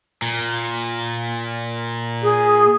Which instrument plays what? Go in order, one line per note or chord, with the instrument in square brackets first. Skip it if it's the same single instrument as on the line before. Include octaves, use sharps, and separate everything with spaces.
[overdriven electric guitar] A#2
[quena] G#4